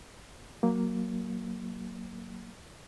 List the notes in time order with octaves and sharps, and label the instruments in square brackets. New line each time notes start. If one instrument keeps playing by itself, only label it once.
[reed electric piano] F#3 A#3